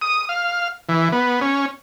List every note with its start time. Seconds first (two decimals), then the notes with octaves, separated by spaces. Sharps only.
0.02 D#6
0.29 F5
0.89 E3
1.12 B3
1.41 C#4